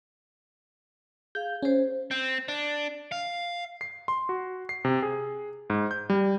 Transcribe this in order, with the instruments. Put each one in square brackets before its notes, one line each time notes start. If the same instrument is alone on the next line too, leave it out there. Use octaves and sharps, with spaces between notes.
[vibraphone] G#4 F5 [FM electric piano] G6
[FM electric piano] C#4 [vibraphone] G#4 C5
[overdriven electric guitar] C4
D4
F5
[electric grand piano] C7
C6
F#4
C7
C3
G#4
G#2
G6
G3